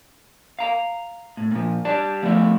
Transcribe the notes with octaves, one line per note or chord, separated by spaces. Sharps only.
F5 A#5
A2
A#2 F3
G3 D5 A5
F3 A3 B3 E4